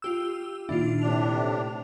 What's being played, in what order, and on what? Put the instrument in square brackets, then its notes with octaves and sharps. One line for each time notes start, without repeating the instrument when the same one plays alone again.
[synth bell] F4 G4 E6
[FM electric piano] A#2 D#3 E4 [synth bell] D4 F4
[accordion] A2 C3 D4 [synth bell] F7